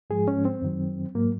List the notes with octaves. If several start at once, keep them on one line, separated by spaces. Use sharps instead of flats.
G#2 F3 G#3 G#4
C#4
C4
F#2 D#3 F#3
G#2 F#3 A#3